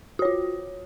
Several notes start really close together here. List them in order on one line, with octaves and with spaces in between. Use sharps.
F#4 C#5 F4